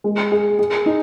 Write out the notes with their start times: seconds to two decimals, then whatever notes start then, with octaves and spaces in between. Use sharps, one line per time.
0.04 G#3
0.32 G#4
0.59 G#4
0.86 D#4